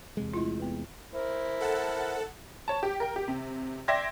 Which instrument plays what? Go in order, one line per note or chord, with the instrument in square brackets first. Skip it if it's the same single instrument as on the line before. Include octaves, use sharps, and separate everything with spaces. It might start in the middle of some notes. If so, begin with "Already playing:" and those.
[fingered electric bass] E2 C3 G#3
[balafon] A3 E4 F4
B3 B4
[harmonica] E4 A#4 [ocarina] C5
[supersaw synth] A4 F#5 A5
[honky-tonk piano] C#5 A5
G4
A#4 G5
G4
C3
D5 E5 G5 C6 G#6 A#6